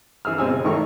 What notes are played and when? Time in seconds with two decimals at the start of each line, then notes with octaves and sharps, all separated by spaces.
0.25 E3 G#4 E6 F6
0.38 B2 G#3 C4 G#4 G#5 E6
0.52 C#3
0.64 G#1 D#3 E3 A3 A#4 C#6